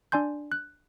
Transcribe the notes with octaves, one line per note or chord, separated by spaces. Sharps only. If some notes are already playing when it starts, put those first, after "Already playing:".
D4 D5 G#5 C6 G6
F#6